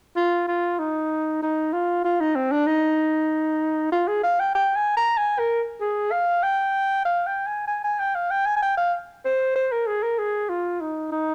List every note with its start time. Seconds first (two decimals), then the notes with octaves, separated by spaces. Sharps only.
0.16 F4
0.48 F4
0.79 D#4
1.42 D#4
1.73 F4
2.04 F4
2.20 D#4
2.36 C4
2.52 D4
2.67 D#4
3.92 F4
4.08 G#4
4.23 F5
4.39 G5
4.55 G5
4.76 G#5
4.97 A#5
5.17 G#5
5.39 A#4
5.81 G#4
6.11 F5
6.43 G5
7.05 F5
7.27 G5
7.47 G#5
7.68 G#5
7.84 G#5
8.00 G5
8.15 F5
8.31 G5
8.46 G#5
8.56 G#5
8.62 G5
8.77 F5
9.25 C5
9.56 C5
9.72 A#4
9.87 G#4
10.03 A#4
10.19 G#4
10.49 F4
10.81 D#4
11.12 D#4